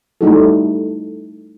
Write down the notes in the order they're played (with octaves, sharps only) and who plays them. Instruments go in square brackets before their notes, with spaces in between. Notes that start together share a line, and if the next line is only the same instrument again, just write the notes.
[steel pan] G3 A3 D#4 E4 F#4 A4